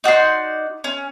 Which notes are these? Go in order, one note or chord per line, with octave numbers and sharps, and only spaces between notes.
D#4 F#4 D5 C6
C#4